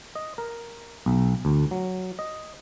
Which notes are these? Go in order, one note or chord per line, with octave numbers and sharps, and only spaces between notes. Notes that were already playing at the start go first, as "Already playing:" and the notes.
D#5
A#4
B1
D2
F#3
D#5